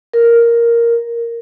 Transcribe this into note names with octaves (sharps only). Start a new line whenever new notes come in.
A#4